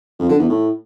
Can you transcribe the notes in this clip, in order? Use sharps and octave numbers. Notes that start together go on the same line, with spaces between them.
F2
D3
E2
A2